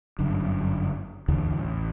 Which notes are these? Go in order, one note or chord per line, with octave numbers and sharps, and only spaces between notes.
G1 F#2 D3
A1 D#2 D3 E3
A1